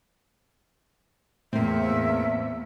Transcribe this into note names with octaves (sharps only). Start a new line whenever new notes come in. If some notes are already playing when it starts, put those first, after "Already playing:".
E2 A2 A#3 C4 E5